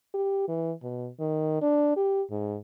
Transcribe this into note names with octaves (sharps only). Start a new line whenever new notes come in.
G4
E3
B2
D#3
D4
G4
G#2